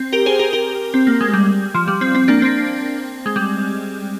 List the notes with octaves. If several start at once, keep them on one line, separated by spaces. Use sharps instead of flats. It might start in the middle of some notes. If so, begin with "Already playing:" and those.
Already playing: C4
G4 A#4
G#4 C5
G4 A#4
G4 A#4
C4
A#3
G#3
G3
F3
G3
C4
C4
A#3 D4
C4
G#3
G3